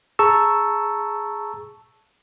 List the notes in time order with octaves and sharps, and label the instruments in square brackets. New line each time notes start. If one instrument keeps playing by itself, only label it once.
[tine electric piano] G#4 A5 A#5 C#6 E6